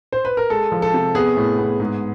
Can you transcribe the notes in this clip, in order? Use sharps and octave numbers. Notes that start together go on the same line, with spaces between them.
C5
B4
A#4
G#3 A4
F3
A4
C3
B3 G#4
A2
B3
G#2